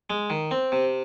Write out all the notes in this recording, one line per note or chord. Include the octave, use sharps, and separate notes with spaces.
G#3
D#3
C4
C3